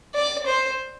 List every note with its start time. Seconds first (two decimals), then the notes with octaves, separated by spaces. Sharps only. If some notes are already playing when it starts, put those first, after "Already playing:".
0.15 D5
0.46 C5